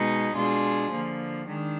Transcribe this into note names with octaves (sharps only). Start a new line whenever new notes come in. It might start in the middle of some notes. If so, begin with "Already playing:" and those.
Already playing: B2 G#3 B3 D#4
B2 G#3 D4 F4 G#4
D3 F3 A#3
D#3 G#3 D4